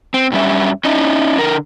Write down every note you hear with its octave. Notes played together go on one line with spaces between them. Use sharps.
C4
G2 C#3 G3 C#4 E5
C#4 D#4 E4 D#5
D3 A#4